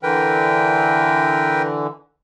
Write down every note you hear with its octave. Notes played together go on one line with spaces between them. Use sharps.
D3 E3 A#4 B4 G5